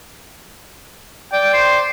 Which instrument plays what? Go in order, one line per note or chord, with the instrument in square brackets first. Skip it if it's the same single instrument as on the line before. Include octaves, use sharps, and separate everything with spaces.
[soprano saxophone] D5 [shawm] G5
[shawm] C5